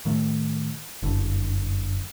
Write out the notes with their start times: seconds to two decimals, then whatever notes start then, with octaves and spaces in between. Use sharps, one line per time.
0.05 A2 D#3 A3
1.02 F#1 G2 D3